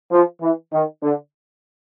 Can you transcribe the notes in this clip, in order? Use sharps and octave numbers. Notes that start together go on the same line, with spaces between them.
F3
E3
D#3
D3